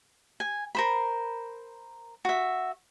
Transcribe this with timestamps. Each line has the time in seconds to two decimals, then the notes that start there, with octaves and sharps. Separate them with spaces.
0.40 G#5
0.75 A#4 C5 B5
2.25 F#4 E5